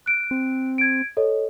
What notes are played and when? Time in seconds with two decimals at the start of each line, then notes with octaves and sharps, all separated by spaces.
0.06 F#6 D7
0.31 C4
0.78 G#6 D7
1.17 A4 C#5 D#5